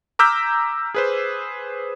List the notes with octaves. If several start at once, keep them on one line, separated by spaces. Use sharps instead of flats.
A#5 D6 E6 F6 G6 B6
G#4 B4 C5